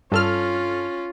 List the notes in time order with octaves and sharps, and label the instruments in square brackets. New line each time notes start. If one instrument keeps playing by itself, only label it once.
[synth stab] G2 A4 F6 [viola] C#4 F4